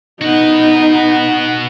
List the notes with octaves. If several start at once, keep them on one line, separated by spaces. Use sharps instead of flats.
B3 D#4 F#4 B4